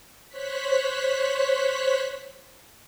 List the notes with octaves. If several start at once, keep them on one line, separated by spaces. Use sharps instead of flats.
C5 C#5 F#6 B6